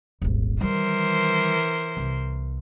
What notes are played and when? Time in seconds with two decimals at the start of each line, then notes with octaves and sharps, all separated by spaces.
0.22 D#1 G#1
0.61 D#3 E3 G3 A#4 C5
1.97 C2